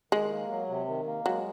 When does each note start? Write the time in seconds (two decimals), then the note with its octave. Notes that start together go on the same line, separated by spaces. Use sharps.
0.12 D#3 G#3
0.31 A#3
0.50 F#3
0.69 C3
0.88 D#3
1.07 A#3
1.26 F#3 G#3